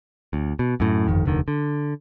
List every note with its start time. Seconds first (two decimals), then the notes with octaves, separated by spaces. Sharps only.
0.33 D2
0.59 B2
0.80 F#2 A2
1.08 G1 F2 D#3
1.26 F1 D#2 D3 D#3
1.48 D3